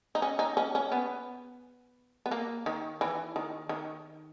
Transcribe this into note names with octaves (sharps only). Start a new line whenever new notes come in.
D#4
C#4
D#4
C#4
C#4
B3
B3
A#3
D#3
E3
D#3
D#3